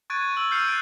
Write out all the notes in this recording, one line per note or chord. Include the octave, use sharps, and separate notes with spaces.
C#6 F#6 G#6 A6 D7 D#7
D#7
E6 F#7
F6 G6 C7 C#7 D#7 F7
F#6 A6 D7